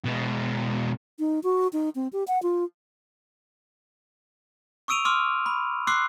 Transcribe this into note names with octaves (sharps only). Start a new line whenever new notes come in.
B2 G#3
D#4
F#4
D#4
C4
G4
F#5
F4
C#6 D#6 E6 D7 D#7 F7
C6 D6 E6 F6
B5
C6 D6 E6 F#6 C7